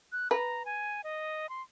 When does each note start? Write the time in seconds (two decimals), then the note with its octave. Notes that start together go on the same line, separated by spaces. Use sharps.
0.12 F#6
0.31 B4 A#5
0.65 G#5
1.04 D#5
1.49 C6